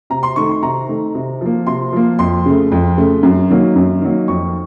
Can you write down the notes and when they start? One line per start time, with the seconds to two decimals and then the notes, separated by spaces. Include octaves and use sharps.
0.10 C3 A#5
0.23 C6
0.36 D#3 A3 C#6
0.49 C6
0.62 C3 A#5
0.89 D#3 A3
1.15 C3
1.41 F3 A#3
1.67 C3 C6
1.92 F3 A#3
2.19 F2 C6
2.46 C#3 A3
2.72 F2
2.98 C#3 A3
3.23 F#2
3.50 D#3 F#3 A#3
3.76 F#2
4.01 D#3 F#3 A#3
4.28 F2 C#6